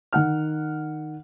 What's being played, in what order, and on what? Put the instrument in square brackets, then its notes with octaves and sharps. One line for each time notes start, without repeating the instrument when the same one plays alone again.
[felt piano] D#3 F#5 F6